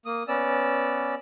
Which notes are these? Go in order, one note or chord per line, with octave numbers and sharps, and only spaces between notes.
A#3 D#6
B3 C#4 D5 E6